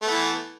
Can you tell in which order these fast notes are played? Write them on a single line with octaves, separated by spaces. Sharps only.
A3 B3 E3